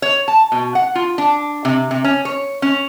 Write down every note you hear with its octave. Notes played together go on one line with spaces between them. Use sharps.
C#5
A5
B2
F#5
F4
D4
C3
C3
C#4
C#5
C#4